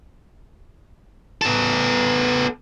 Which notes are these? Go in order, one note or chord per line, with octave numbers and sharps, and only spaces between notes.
B3 A4